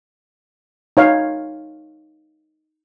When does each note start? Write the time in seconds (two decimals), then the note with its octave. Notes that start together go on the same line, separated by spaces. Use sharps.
0.97 D#4 C#5 F5